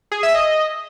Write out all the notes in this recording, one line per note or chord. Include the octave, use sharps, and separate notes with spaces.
G#4
E5
D#5